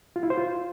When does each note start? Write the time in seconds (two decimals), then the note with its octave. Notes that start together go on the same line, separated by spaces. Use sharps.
0.16 F4
0.23 E4
0.30 C5
0.38 F4